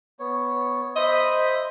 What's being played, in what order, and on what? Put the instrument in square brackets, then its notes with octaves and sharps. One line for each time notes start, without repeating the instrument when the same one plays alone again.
[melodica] B3 C#5
[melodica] C5 E5 B5 [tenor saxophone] D#5